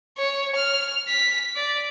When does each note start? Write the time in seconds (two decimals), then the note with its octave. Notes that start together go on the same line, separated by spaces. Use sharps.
0.18 C#5
0.56 F6
1.08 B6
1.56 D5